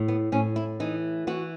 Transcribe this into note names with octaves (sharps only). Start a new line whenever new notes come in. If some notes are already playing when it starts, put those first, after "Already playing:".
Already playing: A2
B3
A2 C#4
E4
E3 D#4
E3 F#4